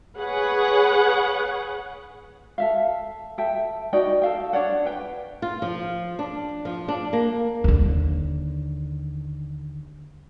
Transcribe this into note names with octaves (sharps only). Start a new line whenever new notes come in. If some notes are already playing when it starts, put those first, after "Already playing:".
G#4 B4 C#5 F#5
A4 E5 F5
A4 E5 G5
D#4 F#4 D5 G5
A4 F5 G5
D4 C#5 D5 F#5
B4 G5
F4
F3
D4
F3
D4
A#3
D#2 D3